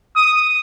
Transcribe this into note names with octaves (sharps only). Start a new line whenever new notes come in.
D#6